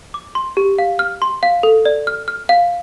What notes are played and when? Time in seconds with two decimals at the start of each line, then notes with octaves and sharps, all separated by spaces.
0.14 D6
0.35 C6
0.57 G4
0.79 F5
0.99 F6
1.22 C6
1.43 F5
1.63 A4
1.85 D5
2.07 F6
2.28 F6
2.49 F5